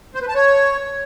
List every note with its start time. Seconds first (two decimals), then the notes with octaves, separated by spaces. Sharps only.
0.15 C5
0.21 B4
0.28 A5
0.35 C#5